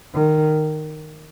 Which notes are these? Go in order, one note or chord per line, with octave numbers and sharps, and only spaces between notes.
D#3